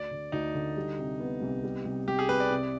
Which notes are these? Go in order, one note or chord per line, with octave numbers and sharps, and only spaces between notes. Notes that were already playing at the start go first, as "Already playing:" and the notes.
Already playing: D2 D5
D3
D2 D#4
D3
G3
C3
B3
C2
G3
C2
C2 G4
G#4
C2 B4
D5
C3